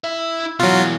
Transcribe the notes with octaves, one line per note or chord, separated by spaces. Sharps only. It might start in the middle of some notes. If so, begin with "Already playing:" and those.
E4 E5
B2 E3 F#3 F4